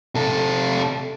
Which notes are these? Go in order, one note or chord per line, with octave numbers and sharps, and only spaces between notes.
C3 A4